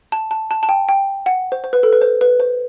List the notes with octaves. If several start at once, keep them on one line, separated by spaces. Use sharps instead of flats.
A5
A5
A5
A5
G5
G5
F#5
C5
C5
B4
A4
B4
C5
B4
C5